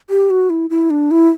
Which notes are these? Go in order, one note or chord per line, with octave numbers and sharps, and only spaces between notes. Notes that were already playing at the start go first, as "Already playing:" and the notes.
G4
F#4
E4
E4
D4
E4